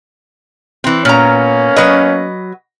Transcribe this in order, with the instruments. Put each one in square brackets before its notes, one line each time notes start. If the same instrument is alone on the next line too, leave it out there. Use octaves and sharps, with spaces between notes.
[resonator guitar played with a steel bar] E3 C4
[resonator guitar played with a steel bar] A#2 A#5 [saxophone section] A#3 B3 C#4
[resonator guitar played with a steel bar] F#3 B4 D#5